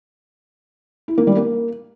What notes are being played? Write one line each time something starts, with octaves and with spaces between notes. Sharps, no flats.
E4
A#3
G3
A#3